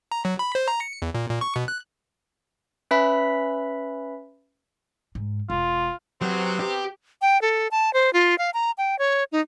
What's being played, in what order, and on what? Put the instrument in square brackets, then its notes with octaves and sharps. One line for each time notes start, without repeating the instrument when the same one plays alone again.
[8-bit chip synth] A#5
F#3
B5
C5
A#5
C#7
E2
A#2
A#2
C#6
B2
F#6
[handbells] C#4 B4 E5 B5 B6
[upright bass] G#2
[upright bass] E1 [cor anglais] F4
[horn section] C3 B3 C4 [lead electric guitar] F#3
[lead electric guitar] G4
[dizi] G5
A4
A5
C5
F4
F5
A#5
G5
C#5
D#4